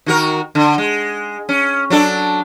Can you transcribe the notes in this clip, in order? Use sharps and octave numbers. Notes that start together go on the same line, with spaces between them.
D#3 F#4 A#4
D3
G#3
C#4
F#3 D4 A4